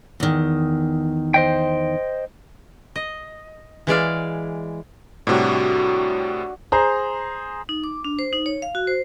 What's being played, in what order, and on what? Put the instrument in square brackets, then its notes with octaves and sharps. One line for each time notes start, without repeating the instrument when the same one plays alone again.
[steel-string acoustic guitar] E2 D#3
[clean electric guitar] C5 D#5 G5
[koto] D#5
E3 G#3 D5 F5
[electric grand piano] A2 C3 G3 [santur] D4 F#4 C#5
[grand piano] G#4 C5 A#5
[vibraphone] D#4
D6
D4
C5
D#4
C#5
F5
F#4
C5